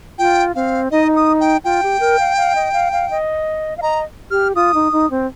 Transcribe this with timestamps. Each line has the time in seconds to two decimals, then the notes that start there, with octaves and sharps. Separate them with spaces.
0.18 F4 G5
0.55 C4 F5
0.91 D#4 D#5
1.16 D#6
1.40 G5
1.64 F4 G5
1.83 G4
2.00 A#4
2.19 F5
2.37 F5
2.55 D#5
2.73 F5
2.92 F5
3.11 D#5
3.77 F5
3.82 D#5 A#5
4.31 G4 F6
4.55 F4 D#6
4.74 D#4
4.92 D#4
5.10 C4